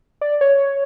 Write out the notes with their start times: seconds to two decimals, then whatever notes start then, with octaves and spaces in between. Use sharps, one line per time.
0.21 D5
0.41 C#5